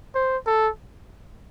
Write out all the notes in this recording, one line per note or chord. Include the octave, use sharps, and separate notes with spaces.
C5
A4